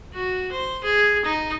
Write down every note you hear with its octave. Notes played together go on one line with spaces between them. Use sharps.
F#4
C5
G#4
D#4